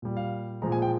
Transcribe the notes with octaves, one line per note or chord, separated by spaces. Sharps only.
A#2 G3
F5
A#2 F3 G#3 A#5
G#5
G5